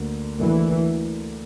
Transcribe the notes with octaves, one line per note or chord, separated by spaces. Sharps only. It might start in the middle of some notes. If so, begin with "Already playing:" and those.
Already playing: D2 D3 A#3
D2 D3 E3 A#3